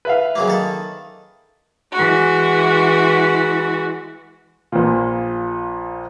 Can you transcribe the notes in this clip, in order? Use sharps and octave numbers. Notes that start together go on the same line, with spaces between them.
B4 E5 F5
C#3 F#3 A#3
D#3 A4
E3 G#3 F#4
A#1 A#2